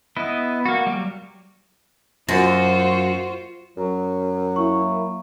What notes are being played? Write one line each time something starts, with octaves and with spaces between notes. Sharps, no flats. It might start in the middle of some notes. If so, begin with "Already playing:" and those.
B3 E4 D#5
A#3 F#4
F#3 G3
F#2 F4 F#4 C5
F#2 F#3
A#3 E4 C#6